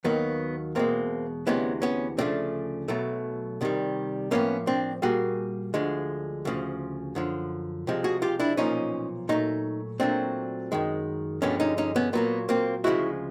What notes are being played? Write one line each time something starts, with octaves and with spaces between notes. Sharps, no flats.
D#2 D#3 F#3 A#3 B3
E2 B2 G#3 A#3 C4
D2 C3 E3 G#3 B3 C#4
B3 C#4
D2 C#3 F3 A3 C4 D4
B1 B2 F#3 A3
C2 C3 D#3 G3
A2 F3 A#3 B3 C#4
C4 D4
A#2 G3 A#3 F#4 G#4
D2 D3 F3 G#3
D2 C#3 F3
F#2 D3 F3
C2 C3 F3 G#3
F#4 G#4
F4 G4
D4 E4
B1 A#2 F3 C#4 D#4
A#2 F#3 A3 C#4 D#4
A#2 F#3 A3 C4 D4
F#2 D#3 G#3
G2 D3 F3 G#3 B3 C#4
C#4 D#4
C#4 D#4
B3 C#4
A#2 F#3 A#3 B3
A#3 C4
D2 C#3 F3 G#3 E4 F#4